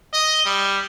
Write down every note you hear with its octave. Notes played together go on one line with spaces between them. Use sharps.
D#5
G3